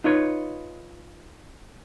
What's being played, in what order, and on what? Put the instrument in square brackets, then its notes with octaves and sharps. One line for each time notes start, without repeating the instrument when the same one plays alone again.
[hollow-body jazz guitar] D#4 F4 B4 C#5